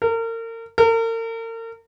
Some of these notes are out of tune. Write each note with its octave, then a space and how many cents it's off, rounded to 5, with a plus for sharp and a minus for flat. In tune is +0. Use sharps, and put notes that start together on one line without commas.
A#4 -35
A#4 -40